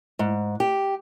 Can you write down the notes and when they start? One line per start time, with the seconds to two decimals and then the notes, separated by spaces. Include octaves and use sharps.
0.19 G#2
0.60 G4